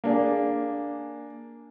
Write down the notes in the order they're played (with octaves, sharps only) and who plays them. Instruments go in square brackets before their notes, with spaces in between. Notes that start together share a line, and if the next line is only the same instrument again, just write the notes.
[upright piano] A#3 D4 G#4